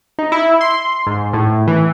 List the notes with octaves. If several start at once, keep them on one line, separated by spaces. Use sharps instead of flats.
D#4
E4
C6
G#2
A2
E3